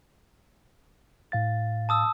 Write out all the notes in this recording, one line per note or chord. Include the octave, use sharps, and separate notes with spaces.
A2 F5 A6
A5 D#6 E6